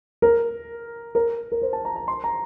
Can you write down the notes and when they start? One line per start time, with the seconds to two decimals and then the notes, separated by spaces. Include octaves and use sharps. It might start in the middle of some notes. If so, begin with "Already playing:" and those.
0.22 A#4
1.15 A#4
1.52 A#4
1.62 C5
1.73 A5
1.85 A#5
1.96 A#5
2.08 C6
2.24 A#5